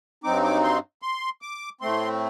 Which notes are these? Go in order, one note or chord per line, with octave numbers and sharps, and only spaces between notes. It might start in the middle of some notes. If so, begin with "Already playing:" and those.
G2 F#3 C4 D#4 D6
D6
C6
C6
D6
A2 A3 C4 C6